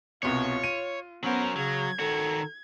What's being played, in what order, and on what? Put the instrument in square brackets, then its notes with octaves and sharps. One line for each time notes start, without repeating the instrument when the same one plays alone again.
[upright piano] C2 B2 [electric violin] F4 [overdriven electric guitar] C#5
[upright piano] D#7
[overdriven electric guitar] F#3 A#4 [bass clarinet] B3 [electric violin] C#4 C5
[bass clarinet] C#3 [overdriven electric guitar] F#3 [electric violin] G#6
[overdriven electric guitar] D#3 F#4 [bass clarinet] A4